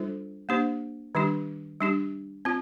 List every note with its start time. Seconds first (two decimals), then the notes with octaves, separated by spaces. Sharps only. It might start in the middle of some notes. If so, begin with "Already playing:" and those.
Already playing: G3 D4 F4 A4 C5
0.49 A#3 D4 G4 C5
1.15 D#3 G3 D4 G4
1.81 G3 D4 G4
2.45 C4 F4